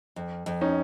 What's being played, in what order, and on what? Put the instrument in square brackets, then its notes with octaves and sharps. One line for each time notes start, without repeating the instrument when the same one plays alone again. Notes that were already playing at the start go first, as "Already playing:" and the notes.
[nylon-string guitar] F2
F2
[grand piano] C#4 D#4